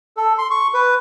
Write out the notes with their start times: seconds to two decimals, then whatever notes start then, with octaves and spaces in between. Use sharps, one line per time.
0.17 A4
0.38 C6
0.51 C#6
0.74 B4